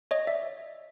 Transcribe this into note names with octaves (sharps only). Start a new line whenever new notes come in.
C#5 D#5
D5 E5